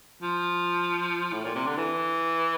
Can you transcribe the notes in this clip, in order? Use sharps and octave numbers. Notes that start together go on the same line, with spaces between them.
F3
A2
A#2
C3
D3
E3